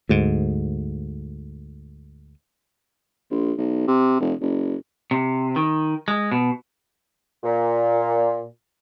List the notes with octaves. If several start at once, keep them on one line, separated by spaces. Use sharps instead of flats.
D2 G#2
A#1
B1
C3
F1
F#1
C3
D#3
G#3
B2
A#2